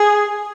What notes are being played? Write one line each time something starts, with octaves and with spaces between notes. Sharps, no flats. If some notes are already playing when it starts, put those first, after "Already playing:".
Already playing: G#4